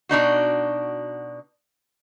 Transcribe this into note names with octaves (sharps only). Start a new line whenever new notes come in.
B2 D4 D#4 F#4